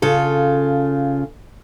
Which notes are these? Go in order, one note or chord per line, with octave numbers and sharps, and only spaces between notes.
C#3 F4 A4